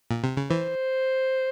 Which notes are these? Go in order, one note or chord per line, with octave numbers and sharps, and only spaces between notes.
A#2
C3
C#3
E3 C5